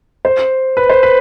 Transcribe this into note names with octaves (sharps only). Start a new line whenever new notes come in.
C5
B4
C5
B4